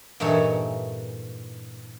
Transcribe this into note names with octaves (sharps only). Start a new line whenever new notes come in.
G2 A#2 E3 D#4 A4 C#5